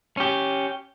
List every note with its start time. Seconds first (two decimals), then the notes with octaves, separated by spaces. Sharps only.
0.17 C#4 G4